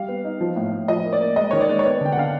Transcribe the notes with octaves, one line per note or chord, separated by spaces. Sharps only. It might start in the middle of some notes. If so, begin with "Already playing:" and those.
Already playing: G3 F5
B3
D#4
F3
A2
A2
F3 D#5
A#3
D5
A#3
G#3 D#5
D#3 C#5
D5
G#3
C#5
B3 D5
D3 G5
F#5
D3 F5